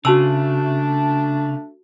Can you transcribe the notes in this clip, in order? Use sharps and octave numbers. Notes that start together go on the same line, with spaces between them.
C#3 A3 D4 F#4 A5 E6